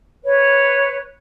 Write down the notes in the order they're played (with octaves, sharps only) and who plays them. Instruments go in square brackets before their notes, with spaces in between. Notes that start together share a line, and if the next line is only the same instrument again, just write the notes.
[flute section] B4 C#5